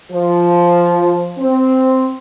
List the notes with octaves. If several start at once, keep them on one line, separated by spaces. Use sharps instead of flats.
F3
C4